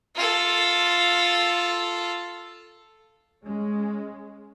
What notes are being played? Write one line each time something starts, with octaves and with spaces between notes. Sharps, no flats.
F4 A4
G#3 C#4